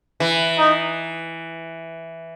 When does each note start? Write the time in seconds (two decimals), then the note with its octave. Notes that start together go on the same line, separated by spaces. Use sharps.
0.20 E3
0.58 D#4